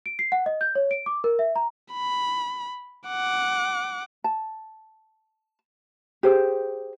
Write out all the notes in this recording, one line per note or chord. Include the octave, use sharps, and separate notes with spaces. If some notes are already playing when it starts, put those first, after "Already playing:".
D7
C7
F#5
D#5
G6
C#5
D7
D6
A#4
E5
A#5
B5
F#5 D6
A5
G4 G#4 C5